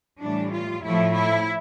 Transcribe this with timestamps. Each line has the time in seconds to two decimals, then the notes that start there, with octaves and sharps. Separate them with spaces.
0.21 A2 E3 G3 D4
0.53 F4
0.83 A2 F3 A3 E4
1.14 E4